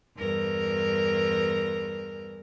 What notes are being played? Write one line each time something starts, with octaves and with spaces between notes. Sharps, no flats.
E2 G2 A#4